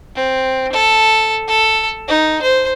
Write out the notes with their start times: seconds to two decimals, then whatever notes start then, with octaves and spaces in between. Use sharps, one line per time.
0.15 C4
0.72 A4
1.48 A4
2.08 D#4
2.42 C5